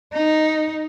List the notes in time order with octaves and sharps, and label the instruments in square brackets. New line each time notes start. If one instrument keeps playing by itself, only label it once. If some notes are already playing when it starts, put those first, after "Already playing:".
[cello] D#4